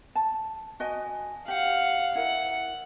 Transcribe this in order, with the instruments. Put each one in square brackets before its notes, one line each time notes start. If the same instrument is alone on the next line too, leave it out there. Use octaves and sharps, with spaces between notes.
[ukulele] A5
F#4 D#5 G#5
[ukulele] G4 [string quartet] F5 F#5
[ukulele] E4 A#4 [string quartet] F#5